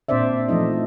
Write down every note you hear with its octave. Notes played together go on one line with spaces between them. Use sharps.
A#2 C4 D4 C5 D5 E5
E3 F3 A3 D#4 D#5